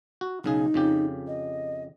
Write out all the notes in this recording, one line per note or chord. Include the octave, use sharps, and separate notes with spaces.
F#4
B1 C#3 D#4 G#4
F2 C#3 G4
D#5